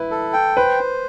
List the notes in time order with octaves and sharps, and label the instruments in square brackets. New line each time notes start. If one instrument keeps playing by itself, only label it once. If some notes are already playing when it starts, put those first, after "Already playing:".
Already playing: [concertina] E4 [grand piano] B4
[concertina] A4
G5
[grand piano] B4 [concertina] C5